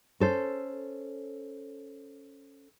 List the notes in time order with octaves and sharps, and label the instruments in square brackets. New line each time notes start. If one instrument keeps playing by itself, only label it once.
[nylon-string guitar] C#4 A4 C5